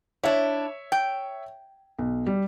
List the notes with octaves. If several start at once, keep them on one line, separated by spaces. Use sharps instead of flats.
D4 E4 C#5 E5
G5
B1
G3